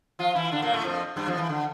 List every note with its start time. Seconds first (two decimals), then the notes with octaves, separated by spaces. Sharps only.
0.19 F3 F4
0.35 E3 E4
0.52 D3 D4
0.62 A#2 A#3
0.73 A2 A3
0.84 F2 F3
1.16 G2 G3
1.28 F2 F3
1.38 E3
1.49 D3